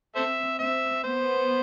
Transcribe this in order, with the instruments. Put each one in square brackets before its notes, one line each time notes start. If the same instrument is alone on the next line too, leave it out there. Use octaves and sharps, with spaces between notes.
[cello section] C4 [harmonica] A4 C5 E5
[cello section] C4 [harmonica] E5
[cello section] B3 [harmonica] C5